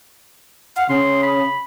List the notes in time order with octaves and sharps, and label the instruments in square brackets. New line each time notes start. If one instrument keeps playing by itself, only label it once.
[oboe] F5 [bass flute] F#5
[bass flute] C#3 [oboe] C6
[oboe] B5